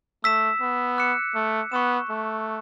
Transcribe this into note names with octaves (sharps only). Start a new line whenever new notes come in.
A3 E6 B6 E7
B3
D6 F#6 C#7 E7
A3
B3 C#6 F#6 C#7 E7
A3